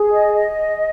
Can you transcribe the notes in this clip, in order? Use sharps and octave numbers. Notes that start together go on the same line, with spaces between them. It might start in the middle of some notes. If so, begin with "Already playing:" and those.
Already playing: G#4
D#5
D#5